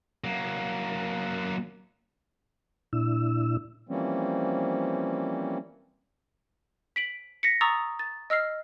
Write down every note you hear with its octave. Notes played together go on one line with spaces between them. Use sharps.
F#3 A#3
A#2 D4 E4 E6
E3 F3 G3 A#3 C4 C#4
B6 D7 F#7
A#6 B6 C#7
A#5 C#6 D#6 E6 A6
A6
D#5 E6 F6 C7